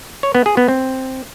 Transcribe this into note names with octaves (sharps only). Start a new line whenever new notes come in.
C#5
B3
G#4
B3
C4